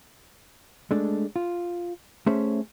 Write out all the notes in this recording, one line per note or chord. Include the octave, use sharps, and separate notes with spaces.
G#3 A3 D4
F4
A3 C#4 G#4 C5 E5